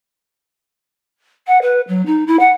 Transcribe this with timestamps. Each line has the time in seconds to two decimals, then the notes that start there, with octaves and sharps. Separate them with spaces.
1.47 F#5
1.62 B4
1.88 F#3
2.06 D#4
2.27 E4
2.39 F#5